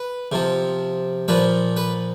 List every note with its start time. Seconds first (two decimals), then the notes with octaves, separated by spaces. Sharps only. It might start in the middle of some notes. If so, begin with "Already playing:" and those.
Already playing: B4
0.32 C3 F3
1.28 A#2 F3 B4
1.77 B4